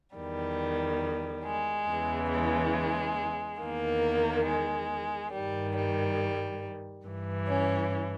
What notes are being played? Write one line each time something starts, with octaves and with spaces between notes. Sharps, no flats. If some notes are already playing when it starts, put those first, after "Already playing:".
E2 D#3 G3
G#3
E2 C#3 E3
G#3
E2 D#3 A#3
G#3
G2 D#3 G3
G3
G2 E3
C#4